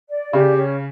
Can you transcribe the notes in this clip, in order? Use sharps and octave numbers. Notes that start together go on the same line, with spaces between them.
D5
C#3 G4
C#4